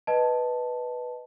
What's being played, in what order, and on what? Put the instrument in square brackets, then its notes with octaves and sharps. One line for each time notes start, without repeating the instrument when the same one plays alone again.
[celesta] B4 D#5 A5